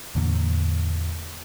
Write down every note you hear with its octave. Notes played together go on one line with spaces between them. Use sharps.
E2 A2 D3 A#3